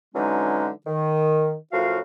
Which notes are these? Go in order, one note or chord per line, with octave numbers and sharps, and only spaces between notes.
D3 E3 F#3 G#3 C#4 D#4
D#3
F#2 A2 F3 F#4 F5